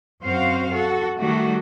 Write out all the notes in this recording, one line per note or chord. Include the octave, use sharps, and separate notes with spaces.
F#2 C4 F#4 C5 F5
F#4 A4
D#3 G3 A3 F#4